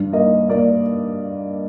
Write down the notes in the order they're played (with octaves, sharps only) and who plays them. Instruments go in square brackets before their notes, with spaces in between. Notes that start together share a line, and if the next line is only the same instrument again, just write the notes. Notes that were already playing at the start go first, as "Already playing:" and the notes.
Already playing: [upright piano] G2
A#3 D#5
A#3 D5